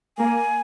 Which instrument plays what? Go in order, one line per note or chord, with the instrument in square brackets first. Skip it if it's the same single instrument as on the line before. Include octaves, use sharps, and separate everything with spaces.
[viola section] A#3 [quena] G#5